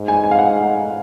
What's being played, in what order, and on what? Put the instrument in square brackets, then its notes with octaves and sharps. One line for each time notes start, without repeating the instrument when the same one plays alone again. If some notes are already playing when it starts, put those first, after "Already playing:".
Already playing: [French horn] G#2
[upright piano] G#5
G#5
F5
F#5